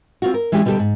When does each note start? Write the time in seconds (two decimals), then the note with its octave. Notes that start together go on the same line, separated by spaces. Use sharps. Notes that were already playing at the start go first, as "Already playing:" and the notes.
0.22 C4 F4 F#4
0.34 A#4
0.52 E3 G#3 C#4 D4 G4
0.65 B2 D3 G3 G4 A4
0.79 G#2